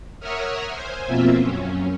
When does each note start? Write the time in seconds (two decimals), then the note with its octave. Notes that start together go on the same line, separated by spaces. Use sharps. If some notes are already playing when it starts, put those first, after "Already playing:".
0.20 A#4 C#5 E5 F#5 D#6 F6
0.70 C5 G#5
1.08 F2 B2 A#3 C4 F4 E5
1.39 F#2 C#4